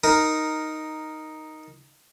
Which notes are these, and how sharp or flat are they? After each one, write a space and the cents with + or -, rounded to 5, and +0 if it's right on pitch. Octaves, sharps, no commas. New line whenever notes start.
D#4 +0 A#4 +0